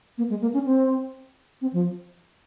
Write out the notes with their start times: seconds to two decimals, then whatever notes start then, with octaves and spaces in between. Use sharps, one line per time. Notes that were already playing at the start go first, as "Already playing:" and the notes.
0.18 A#3
0.30 G#3
0.42 A#3
0.54 C#4
0.66 C4
1.61 C4
1.73 F3